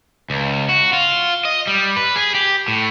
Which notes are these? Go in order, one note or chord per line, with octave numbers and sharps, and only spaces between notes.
C#2
F#4
F4
D#5
G3
B4
G#4
G4
A2